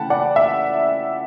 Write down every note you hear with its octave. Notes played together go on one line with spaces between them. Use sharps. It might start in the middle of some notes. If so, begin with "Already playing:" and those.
Already playing: C#3 E3 A3 F#5 G5 A5 B5
D5 F#5
E5